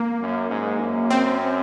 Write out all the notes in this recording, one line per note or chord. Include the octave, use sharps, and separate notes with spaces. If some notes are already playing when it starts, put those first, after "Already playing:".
Already playing: A#3
F#2
G#2
F#2
C4